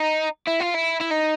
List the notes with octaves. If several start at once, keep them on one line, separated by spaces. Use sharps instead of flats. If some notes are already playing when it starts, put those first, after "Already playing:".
Already playing: D#4
E4
F4
E4
E4
D#4